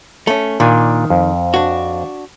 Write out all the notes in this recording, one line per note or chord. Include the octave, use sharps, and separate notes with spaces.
A3 C#4
A#2 D#3 D4 G#5
F2
D4 F#4